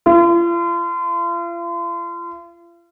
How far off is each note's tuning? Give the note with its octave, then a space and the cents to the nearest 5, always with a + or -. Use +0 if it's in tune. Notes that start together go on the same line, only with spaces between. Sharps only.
F4 -40